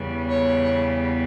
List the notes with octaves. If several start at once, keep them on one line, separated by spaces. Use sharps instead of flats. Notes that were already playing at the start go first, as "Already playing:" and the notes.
Already playing: E2 C#3 G3 B3
C#5